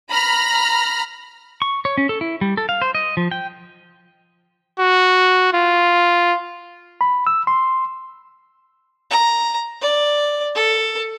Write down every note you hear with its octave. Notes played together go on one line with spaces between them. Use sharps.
A#5 B5 F6
C#6
C#5
C#4
A4
E4
G3
A4
F5
C5
D#5
F3
G5
F#4
F4
B5
E6
C6
A#5
D5
A4